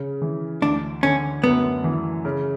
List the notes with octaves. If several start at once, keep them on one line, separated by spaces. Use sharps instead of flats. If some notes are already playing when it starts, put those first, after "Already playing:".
Already playing: C#3
E3
D2 D4
D3 C#4
F#2 B3
E3
C#3